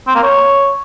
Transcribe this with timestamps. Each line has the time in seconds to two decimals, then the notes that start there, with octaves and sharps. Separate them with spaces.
0.07 C4
0.15 A#3
0.23 C#5